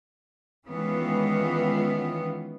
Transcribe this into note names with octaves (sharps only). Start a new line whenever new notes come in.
D#3 E3 G#3 B3 C#4 F4